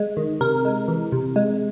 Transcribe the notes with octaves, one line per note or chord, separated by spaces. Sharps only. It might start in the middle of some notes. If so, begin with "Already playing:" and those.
Already playing: G#3
D#3
C3 A#4
G#3
E3
C3
G#3